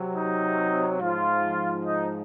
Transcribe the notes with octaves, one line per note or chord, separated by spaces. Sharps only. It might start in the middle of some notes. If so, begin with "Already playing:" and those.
Already playing: C3 F#3
D#4
G#2 F3 F4
D#4